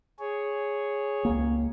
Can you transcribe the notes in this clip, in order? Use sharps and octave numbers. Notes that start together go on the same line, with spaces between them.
G#4 C#5
C#2 A#3